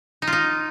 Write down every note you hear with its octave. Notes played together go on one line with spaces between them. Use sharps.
D#4
F4
D#4